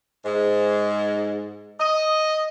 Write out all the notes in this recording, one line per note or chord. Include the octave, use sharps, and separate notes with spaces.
G#2
D#5